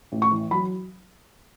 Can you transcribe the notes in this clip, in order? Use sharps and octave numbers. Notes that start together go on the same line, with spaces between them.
A1
C#6
E3
F#3 B5